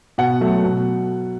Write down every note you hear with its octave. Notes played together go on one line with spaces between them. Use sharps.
B2 F#5
F#3 A3
B2